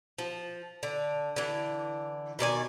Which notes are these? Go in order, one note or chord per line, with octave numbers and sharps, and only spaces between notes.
F3
D3
D3 E3
B2 D#3 D5 G#5